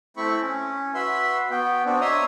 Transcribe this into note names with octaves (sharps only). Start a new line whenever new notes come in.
A3 C4 E4 B5 C#6
C#4
F#4 B4 E5 B5 C6
B3 F#4 G5
B3 C4 D4 F#4
C#5 D#5 E5 A#5 C6 D#6